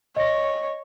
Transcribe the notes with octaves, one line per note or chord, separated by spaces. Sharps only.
C#5 D#5 A#6